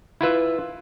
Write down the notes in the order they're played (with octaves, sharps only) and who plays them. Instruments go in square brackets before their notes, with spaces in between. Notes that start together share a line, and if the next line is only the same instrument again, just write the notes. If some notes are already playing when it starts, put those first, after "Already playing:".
[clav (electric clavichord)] E4 F4 B4 E5